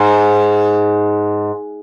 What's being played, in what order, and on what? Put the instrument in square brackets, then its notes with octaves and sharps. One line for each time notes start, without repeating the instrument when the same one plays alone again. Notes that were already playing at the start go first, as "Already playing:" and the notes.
Already playing: [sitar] G#2